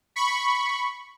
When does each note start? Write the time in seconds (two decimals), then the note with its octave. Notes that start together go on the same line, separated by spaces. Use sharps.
0.16 B5 C#6